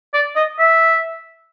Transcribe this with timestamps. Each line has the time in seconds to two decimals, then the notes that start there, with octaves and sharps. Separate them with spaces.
0.14 D5
0.36 D#5
0.59 E5